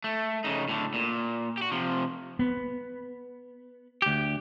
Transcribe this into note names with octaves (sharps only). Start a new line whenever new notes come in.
A3
C#3 D#4
A2 D3
A#2
F#4 G4
C3 F3
B3
D2 G4